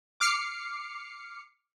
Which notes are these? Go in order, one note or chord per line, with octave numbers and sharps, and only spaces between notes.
D6 F6 C7 C#7